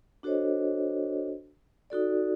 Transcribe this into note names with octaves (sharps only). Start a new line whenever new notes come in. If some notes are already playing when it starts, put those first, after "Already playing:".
D4 F#4 A4 C5 C#5 D#5
D#4 F#4 A4 D5